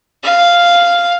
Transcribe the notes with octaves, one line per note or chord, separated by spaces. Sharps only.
F5